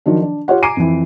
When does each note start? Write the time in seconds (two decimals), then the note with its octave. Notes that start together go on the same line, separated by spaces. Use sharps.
0.06 D#3 F3 F#3 D4
0.22 D4
0.48 F4 G4 C#5 F#5
0.62 G#5 A#5 D6 C7 D7 D#7
0.77 F2 E3